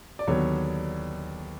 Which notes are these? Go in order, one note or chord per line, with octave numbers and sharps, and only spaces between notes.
D5
D#2 D3 F#3 B3 D4 C#5